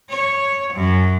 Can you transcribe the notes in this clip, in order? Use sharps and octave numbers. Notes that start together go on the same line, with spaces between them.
C#5
F#2